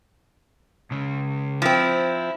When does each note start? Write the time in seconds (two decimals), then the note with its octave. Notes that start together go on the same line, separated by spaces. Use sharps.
0.91 C#2 C#3
1.62 F3 C4 E4